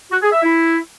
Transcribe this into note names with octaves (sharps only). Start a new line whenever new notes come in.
F#4
G#4
E5
E4